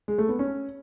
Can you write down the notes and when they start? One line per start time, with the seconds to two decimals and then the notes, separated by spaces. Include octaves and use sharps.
0.08 G#3
0.18 A3
0.29 B3
0.39 C#4